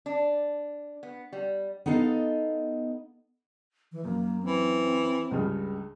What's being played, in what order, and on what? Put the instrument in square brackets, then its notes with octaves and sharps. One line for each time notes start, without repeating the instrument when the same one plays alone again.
[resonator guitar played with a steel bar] D4
B3
G3
[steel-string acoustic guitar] B3 D#4 A4 D#5 F5
[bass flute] E3
[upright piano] F#2 [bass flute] A#3
[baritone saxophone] E3 [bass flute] C4
[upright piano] C#2 G2 C#3